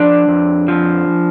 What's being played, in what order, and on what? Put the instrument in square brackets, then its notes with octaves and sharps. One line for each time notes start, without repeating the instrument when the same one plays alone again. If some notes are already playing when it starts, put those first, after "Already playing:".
Already playing: [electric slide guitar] F3 D4 D5
F2
F3